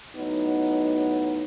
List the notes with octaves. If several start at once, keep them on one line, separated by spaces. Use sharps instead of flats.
A2 F#3 B3 D#4